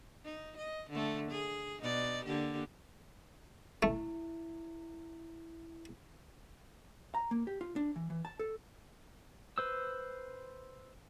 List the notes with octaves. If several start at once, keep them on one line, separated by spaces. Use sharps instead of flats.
D#4
D#5
D3 A3
G#4
B2 D#4 D5
D3 A#3 G4
A3 E4
A#5
A#3
G4
F4
D4
E3
E3
A5
A4
B4 C5 E6